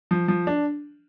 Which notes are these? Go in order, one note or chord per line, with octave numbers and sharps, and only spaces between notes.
F3
F3
D4